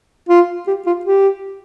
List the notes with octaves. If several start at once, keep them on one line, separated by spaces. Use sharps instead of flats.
F4
G4
F4
G4